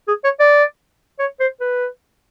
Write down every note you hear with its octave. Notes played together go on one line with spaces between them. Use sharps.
G#4
C#5
D5
C#5
C5
B4